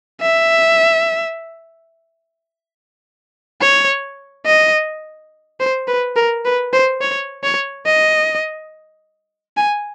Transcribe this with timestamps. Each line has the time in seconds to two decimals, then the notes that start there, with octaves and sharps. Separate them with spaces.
0.21 E5
3.62 C#5
4.46 D#5
5.60 C5
5.88 B4
6.16 A#4
6.45 B4
6.73 C5
7.01 C#5
7.43 C#5
7.87 D#5
9.57 G#5